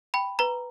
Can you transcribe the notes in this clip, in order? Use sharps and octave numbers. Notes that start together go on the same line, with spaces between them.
G5 B5
B4 A#5